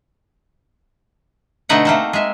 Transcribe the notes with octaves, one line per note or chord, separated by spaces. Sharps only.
B2 D3 A3 D#4 B4 F#5
A3 A#3 C4
G#3 E5